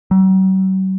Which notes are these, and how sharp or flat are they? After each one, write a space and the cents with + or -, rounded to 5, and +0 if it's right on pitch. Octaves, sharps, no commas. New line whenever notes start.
F#3 +45